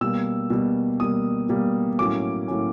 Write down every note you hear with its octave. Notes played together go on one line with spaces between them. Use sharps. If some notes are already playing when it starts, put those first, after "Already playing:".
B2 G3 A#3 E6
B2 G3 A#3
B2 G3 A#3 D#6
B2 G3 A#3
A2 F#3 A#3 C#4 D6
A2 F#3 A#3 C#4